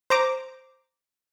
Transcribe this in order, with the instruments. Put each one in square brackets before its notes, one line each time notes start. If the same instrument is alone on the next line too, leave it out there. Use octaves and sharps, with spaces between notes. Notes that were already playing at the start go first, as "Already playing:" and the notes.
[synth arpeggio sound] C5 A#5 D6